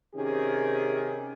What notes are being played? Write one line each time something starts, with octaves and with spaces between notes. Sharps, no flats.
C3 D#3 C#4 G4 G#4